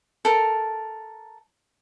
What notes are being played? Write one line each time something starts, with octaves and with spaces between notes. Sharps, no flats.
A4 A#4